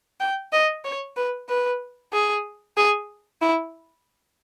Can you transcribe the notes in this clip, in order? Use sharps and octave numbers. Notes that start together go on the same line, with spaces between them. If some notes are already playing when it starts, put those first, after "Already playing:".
G5
D#5
C#5
B4
B4
G#4
G#4
E4